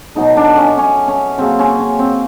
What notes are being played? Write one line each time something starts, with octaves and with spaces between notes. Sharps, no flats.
B2 F#3 A3 D#4
D4
C#4
C#4
C#4
C#3 F#3 A#3 C4
C#4
C#4
C4